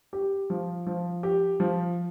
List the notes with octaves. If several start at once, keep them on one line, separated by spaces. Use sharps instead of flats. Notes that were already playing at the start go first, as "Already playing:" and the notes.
G4
F3
F3
G4
F3